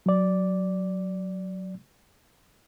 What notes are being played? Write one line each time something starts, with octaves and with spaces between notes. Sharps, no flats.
F#3 D5